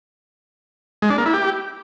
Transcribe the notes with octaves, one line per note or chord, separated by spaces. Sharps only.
G#3
D4
A#3
E4
G4